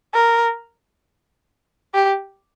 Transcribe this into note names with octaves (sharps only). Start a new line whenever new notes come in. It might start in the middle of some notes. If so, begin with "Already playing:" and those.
A#4
G4